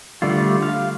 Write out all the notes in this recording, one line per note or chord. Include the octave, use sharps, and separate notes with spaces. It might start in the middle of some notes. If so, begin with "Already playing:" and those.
D3 G3 A3 F4
F5